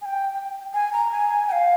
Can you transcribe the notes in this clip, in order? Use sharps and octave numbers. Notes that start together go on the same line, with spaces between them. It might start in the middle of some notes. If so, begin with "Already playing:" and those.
G#5
G5
G#5
A#5
G#5
G5
F5